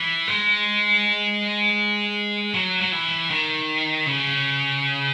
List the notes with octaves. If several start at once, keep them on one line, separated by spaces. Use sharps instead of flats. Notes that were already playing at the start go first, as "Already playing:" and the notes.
Already playing: E3
G#3
F#3
F#3
E3
D#3
C#3